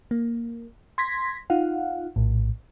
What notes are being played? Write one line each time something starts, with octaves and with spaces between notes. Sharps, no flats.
A#3
C6 G#6 A#6 B6
D#4 F4 F5 F#5
A#1 A2